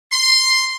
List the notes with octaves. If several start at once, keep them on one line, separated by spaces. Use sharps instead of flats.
C6